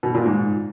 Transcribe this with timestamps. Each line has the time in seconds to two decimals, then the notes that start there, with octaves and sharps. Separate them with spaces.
0.03 B2
0.14 A#2
0.26 G#2